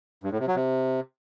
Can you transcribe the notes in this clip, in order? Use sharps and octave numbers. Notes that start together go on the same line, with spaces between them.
G2
A2
C3
F#3
C3